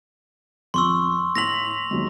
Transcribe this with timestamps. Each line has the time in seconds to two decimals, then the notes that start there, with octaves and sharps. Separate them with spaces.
0.74 F2 C6 C#6 E6
1.35 A2 A#6 B6 F7 F#7
1.91 D#2 F#3 G#3